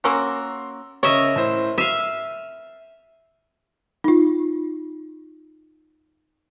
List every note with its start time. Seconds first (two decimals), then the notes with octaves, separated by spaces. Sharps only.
0.04 A#3 C#4 F#4 A#5 C6 E6
1.03 C#3 A#4 C#5 D#5 E5
1.36 A2 C5
1.78 E5 F5 D#7
4.04 D#4 F4